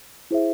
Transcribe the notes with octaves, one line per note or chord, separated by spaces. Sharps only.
E4 G#4 C5 E5